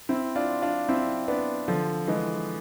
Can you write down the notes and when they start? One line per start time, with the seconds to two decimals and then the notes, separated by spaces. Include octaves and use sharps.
0.09 C4 E4
0.36 D4 F4
0.62 D4 F4
0.89 C4 E4
1.28 B3 D4
1.68 D3 F3
2.07 E3 G#3